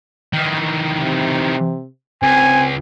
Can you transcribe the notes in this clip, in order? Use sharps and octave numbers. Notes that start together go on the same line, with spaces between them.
D#3 E3
C3
C#2 C4 G#5